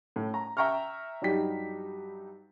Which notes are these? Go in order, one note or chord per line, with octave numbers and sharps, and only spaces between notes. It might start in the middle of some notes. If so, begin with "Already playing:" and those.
A2
A#5
E5 G5 A#5 C#6 F6
G2 F#3 G3 D#4 G4 B6